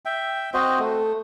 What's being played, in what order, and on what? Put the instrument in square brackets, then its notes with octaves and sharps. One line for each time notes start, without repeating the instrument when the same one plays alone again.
[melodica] E5 G5
C4 F#4 C5 D#5
A3